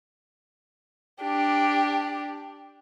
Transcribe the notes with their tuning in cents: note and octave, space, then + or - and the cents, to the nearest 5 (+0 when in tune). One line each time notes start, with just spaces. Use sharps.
D4 +0 G4 +5